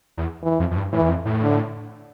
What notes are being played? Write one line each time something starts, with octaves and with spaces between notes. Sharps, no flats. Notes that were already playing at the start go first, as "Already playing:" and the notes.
E2
E3
F2
F2
G2
A2 E3
E2
F2
A2
D3